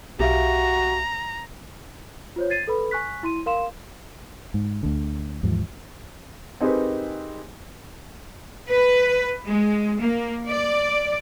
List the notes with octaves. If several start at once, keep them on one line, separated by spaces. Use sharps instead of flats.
B1 F#4 G4 E5 F5 A#5
F4 C5 C#5
G#6 A6 C7 D#7
A4 B4 B5
G#5 C#6 F#6 B6
E4 C6 D#7
A#4 F5 C6 E7
G#2
D2 D3
D#2 G#2 E3 F3
C4 D#4 G4 G#4 A#4 B4
B4
G#3
A#3
D5